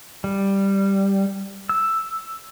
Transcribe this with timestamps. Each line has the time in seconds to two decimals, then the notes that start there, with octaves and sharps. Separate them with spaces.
0.24 G3
1.69 E6